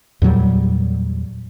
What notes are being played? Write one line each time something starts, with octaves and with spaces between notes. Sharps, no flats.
E2 A#2 F#3 G3